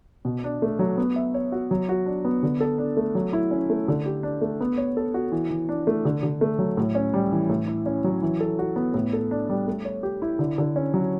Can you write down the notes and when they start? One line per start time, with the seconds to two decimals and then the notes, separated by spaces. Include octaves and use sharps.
0.25 B2
0.44 D4
0.62 A3
0.79 F#3
0.97 B3
1.16 E5
1.34 C#5
1.52 F#4
1.71 F#3
1.89 F#4
2.06 D4
2.25 B3
2.43 D3
2.60 A4
2.78 D4
2.97 A3
3.15 F#3
3.33 E4
3.51 C#4
3.70 A3
3.88 D3
4.06 G4
4.23 D4
4.42 A3
4.60 B3
4.78 C#5
4.97 A4
5.14 F#4
5.32 E3
5.50 E3
5.69 D4
5.87 A3
6.05 D3
6.23 D3
6.41 A3
6.59 F#3
6.77 A2
6.95 C#4
7.14 G3
7.32 E3
7.50 A2
7.67 E4
7.86 C#4
8.04 F#3
8.22 E3
8.40 A4
8.59 F#4
8.76 B3
8.94 A2
9.13 A4
9.31 D4
9.50 G3
9.67 A3
9.85 C#5
10.03 G4
10.22 E4
10.39 D3
10.58 D3
10.76 C#4
10.94 F#3